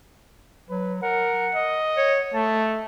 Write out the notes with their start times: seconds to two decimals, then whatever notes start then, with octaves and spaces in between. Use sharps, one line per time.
0.69 F#3 B4
1.02 A#4 F#5
1.55 D#5
1.97 C#5
2.34 A3 A5